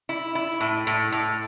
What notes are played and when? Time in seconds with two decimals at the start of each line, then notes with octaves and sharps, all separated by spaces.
0.09 E4
0.35 E4
0.60 A2
0.87 A2
1.12 A2